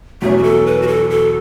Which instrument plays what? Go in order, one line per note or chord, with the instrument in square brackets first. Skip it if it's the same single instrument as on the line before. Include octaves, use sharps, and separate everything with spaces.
[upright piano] E2 B2 F#3 C#4 [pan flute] A3
[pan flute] F#4
A4
B4
F#4
A4
A4